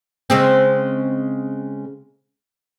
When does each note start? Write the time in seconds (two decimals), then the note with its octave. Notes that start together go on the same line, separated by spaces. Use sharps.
0.30 C#3 G#3 C4